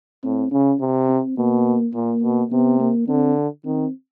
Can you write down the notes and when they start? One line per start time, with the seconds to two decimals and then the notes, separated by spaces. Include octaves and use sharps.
0.24 A2 C4
0.52 C#3 C#4
0.81 C3
1.09 C4
1.38 B2 A#3
1.94 A#2 A#3
2.22 B2
2.51 C3 B3
2.80 A#3
3.08 D3 C4
3.65 D#3 C4